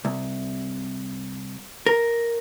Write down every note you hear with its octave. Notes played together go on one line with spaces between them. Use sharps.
C2
A#4